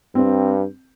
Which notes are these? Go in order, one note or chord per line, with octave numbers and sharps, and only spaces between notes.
G2 C4